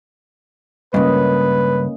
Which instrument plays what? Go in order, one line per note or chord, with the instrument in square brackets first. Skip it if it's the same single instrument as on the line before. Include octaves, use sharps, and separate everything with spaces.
[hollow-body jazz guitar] C#2 G2 [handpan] A#3 C#4 D#5 [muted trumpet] B4